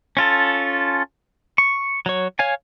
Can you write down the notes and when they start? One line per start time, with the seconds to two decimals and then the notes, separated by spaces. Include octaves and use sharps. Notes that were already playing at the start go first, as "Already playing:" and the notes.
0.17 C#4 F4 A4
1.58 C#6
2.06 F#3 C#5
2.39 C#5 F5 G#5